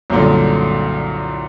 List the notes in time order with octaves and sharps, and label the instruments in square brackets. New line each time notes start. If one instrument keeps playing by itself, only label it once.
[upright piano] C2 F#2 A#2 D3